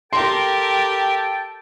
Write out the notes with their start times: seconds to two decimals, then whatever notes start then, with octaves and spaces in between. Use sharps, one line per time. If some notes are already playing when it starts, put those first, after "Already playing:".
0.13 G4 A4 A#4 G5 A5 C6